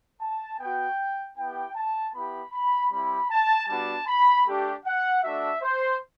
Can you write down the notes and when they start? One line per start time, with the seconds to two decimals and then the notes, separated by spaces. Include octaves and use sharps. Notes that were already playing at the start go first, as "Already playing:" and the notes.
0.22 A5
0.60 B3 F#4 G5
1.37 B3 E4 G4 G5
1.76 A5
2.14 B3 E4 G4 B5
2.54 B5
2.92 G3 C4 E4 G4 B5
3.31 A5
3.69 G3 B3 D4 F#4 A5
4.08 B5
4.47 A3 D4 G4
4.86 F#5
5.24 A3 D4 F#4 E5
5.63 C5